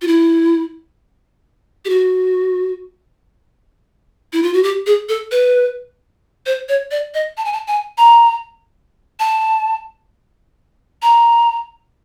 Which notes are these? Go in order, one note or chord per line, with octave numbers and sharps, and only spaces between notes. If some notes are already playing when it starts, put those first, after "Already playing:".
F4
E4
G4
F#4
E4
F4
F#4
G4
G#4
A4
B4
C5
C#5
D5
D#5
A5
G#5
A5
G#5
A#5
A5
A#5